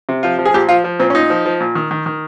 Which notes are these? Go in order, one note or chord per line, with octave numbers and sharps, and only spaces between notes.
C3
F3 F4
F3
G#4
A#2 G4
F3 F4
F3
A#2 C4
C#4
A#2 D#4
F3
F3
A#2
D#3
D#3
D#3